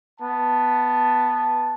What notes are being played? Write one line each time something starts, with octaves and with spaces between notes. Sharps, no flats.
B3 A5